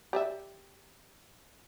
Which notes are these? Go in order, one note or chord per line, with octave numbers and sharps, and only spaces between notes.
G4 D5 E5